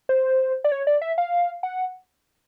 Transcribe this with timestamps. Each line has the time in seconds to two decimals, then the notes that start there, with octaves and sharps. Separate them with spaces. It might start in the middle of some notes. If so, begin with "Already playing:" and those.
0.09 C5
0.64 D5
0.72 C#5
0.87 D5
1.02 E5
1.18 F5
1.63 F#5